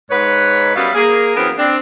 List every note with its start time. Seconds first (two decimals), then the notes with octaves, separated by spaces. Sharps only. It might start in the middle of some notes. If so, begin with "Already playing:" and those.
0.11 G#2 B4 C#5
0.76 F#2 G3 B3 F#4 E5 F5
0.95 A#3 G#4
1.36 F#2 E3 B3 C4 A#4
1.58 C4 D4